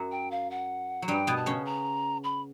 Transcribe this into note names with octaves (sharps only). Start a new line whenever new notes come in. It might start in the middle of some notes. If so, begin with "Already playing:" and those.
Already playing: F#2 F#3
G5
F5
F#5
F#3
G2 G3 G5
B2 B3
A5
C#3 C#4
A#5
B5